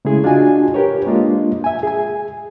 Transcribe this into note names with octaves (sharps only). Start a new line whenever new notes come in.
C#3 G#3 A3 E4 G#4
D4 F4 F#4 D#5 G#5
G4 A#4 B4 C#5
G#3 A#3 D4 F4 D#5
E5 G#5
G#4 G#5